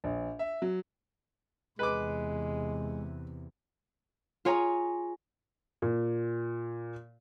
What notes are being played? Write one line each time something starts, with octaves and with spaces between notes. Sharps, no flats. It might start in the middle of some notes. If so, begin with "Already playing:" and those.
A#1
E5
F#3
E2 C3 G#3 B4 D6
F4 G#4 C#5 G#5 A#5
A#2